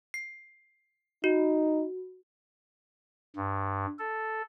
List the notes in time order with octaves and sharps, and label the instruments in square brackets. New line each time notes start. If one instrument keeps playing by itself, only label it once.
[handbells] C7
[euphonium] D#4 [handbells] F#4
[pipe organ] G2
A4